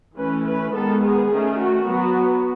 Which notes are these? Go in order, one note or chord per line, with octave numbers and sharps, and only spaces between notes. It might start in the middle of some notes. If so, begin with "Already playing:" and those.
E3 A3 C#4 B4
B4
D#3 G#3 B3 A4
G#4
D#3 A3 C#4
F#4
F#3 B3